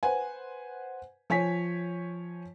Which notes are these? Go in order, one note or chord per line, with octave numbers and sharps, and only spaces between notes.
B4 C5 F#5 G#5
F3 C#5 G#5 B6